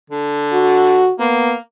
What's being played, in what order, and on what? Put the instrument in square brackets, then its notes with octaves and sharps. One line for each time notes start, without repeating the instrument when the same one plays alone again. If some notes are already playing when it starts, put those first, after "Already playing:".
[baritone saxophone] D3
[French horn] F#4
[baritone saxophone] A#3 [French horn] B3